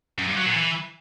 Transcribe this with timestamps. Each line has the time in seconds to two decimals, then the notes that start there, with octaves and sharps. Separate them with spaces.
0.19 F#2
0.28 G2
0.37 F#3
0.46 A#2
0.56 E3